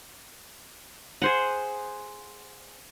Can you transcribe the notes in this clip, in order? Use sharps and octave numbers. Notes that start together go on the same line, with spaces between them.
G#4 C5 F#5